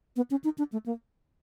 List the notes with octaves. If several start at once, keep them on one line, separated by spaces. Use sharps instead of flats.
B3
C#4
D#4
D4
A3
A#3